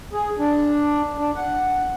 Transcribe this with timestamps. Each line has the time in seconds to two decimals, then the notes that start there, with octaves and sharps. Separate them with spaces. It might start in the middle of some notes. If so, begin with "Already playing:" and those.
0.13 G#4
0.39 D4
1.18 D4
1.36 F#5